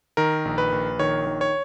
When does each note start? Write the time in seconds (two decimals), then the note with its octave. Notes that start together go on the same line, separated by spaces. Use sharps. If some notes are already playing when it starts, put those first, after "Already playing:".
0.17 D#3 A#4
0.45 A#1
0.58 B4
0.72 A#1
0.99 D#3 C#5
1.27 D#3
1.41 C#5